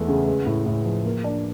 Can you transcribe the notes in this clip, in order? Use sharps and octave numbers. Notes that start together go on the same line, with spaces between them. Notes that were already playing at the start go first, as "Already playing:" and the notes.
Already playing: E2 E3 G#3 A3
C#3
G#3
A2
A2
F3
A#3
D4